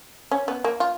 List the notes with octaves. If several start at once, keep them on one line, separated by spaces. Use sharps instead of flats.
C#4
B3
A#3
F4